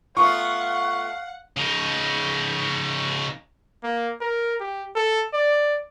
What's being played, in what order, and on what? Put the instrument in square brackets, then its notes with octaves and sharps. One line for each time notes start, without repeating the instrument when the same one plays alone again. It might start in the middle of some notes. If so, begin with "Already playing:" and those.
[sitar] A3 B3 F4 [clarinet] F5 [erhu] F#5 [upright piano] C#6
[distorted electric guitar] C#3 D#4
[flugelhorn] A#3
A#4
G4
A4
D5